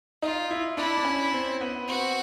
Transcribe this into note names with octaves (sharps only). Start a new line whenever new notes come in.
D#4 F4
E4
D4 E4
D4
C#4
C4
B3
C4 F#4